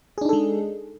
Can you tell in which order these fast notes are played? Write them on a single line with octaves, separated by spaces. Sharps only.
G#4 D4 D#4 A4 G#3